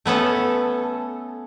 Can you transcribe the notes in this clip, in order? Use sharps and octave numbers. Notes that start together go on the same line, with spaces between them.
A3 B3 C#4 A4